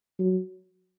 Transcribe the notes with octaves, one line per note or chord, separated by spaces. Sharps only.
F#3